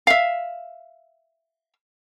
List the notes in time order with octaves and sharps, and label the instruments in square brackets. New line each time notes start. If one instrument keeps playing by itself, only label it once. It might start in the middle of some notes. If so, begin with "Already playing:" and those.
[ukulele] E5 F5